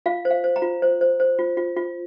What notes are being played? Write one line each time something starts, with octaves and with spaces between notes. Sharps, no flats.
F4 F5
C5
F5
C5
A#5
F4
C5
C5
C5
F4
F4
F4